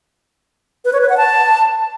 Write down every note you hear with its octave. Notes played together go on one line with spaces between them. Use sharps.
B4
C#5
B4
F#5
A5